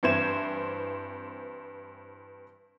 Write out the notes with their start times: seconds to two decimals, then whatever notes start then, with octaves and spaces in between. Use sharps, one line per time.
0.03 G2 E3 C4 G#6 E7